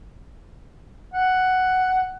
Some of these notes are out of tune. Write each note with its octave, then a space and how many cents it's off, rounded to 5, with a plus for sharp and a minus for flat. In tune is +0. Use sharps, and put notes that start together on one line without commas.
F#5 +5